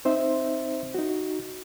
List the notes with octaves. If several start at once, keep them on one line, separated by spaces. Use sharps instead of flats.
C4 D#4 C5 E5
D#4 F#4